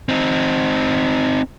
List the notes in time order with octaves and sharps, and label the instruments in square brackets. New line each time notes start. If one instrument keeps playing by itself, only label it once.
[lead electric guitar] C4 D#4